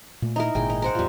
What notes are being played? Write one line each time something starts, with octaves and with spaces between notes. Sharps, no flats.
A#2 A3
D#4 E4 A#4
G#1 A#2 C#3 G#4 G5
D#4
A#4 C5 F#5
E2 A2 G3 F4